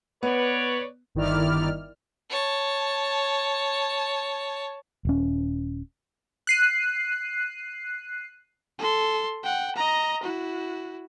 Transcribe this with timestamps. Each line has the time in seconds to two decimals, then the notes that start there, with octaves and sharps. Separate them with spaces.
0.23 B3 B4 C#5 D5
1.15 G1 D#3 E4 D5 F6
2.30 C#5 A5
5.05 D#1 C#4
6.47 F#6 C7 D#7
8.79 A4 C6
9.43 F#5 G5
9.75 D#5 A#5
10.23 E4 F#4